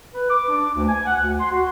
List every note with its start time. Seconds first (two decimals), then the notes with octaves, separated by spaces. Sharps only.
0.14 B4
0.30 D6
0.49 D4
0.74 D2
0.88 G#5
1.06 F#5
1.21 D2
1.40 C6
1.51 F#4